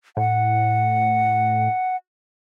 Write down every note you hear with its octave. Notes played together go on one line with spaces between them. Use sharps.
A2 F#5